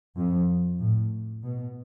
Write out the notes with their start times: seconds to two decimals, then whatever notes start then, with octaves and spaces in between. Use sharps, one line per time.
0.17 F2
0.80 A2
1.42 B2